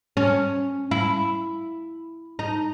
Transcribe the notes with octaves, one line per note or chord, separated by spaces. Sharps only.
C#4
E4
D#4